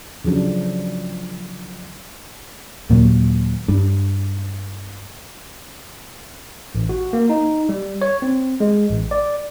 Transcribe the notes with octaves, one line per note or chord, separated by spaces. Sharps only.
C#3 F3 F#3 D4
D#2 A#2 F#3
G2
A1
F#4
A#3
D#4
G3
C#5
C4
G#3
A1
D5